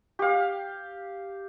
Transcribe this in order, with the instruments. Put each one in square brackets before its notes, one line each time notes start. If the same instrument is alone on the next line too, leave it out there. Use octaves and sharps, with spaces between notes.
[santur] G4 F5